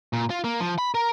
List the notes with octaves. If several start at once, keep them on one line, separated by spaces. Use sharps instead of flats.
A#2
F4
A#3
F3
B5
A#4